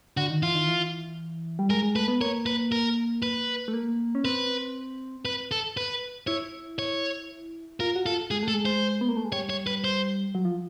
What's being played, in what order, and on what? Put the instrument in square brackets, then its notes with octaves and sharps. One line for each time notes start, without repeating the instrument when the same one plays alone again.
[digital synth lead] D3 [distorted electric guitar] F#4
[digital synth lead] D#3
[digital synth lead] E3 [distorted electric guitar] F4
[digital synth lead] D#3
E3
G3
[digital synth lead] G#3 [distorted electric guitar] A#4
[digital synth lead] G#3
[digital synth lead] A3 [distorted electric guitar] B4
[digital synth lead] B3
[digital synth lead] A#3 [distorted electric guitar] C#5
[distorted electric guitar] B4
A#4
B4
[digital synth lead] A3
A#3
C#4
[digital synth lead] C4 [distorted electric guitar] B4
[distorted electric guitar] B4
A4
B4
[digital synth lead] E4 [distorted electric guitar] C#5
[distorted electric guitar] C#5
[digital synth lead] F4 [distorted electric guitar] A#4
[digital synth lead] F#4
[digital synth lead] F4 [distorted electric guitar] A4
[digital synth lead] G#3 [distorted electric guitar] G#4
[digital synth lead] A3
[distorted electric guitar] A4
[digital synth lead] G#3
[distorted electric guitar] C5
[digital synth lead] B3
A#3
A3
G#3
[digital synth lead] G3 [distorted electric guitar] C#5
[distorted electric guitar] C#5
B4
C5
[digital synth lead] F#3
F3